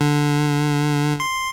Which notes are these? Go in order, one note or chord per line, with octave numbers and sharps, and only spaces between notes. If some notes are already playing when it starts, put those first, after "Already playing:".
D3
C6